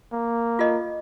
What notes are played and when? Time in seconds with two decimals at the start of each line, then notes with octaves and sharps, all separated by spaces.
0.12 A#3
0.59 F4 A4 D#5